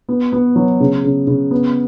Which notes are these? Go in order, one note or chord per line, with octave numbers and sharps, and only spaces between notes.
B3
B3
F#3
C#3
C#3
C#3
B3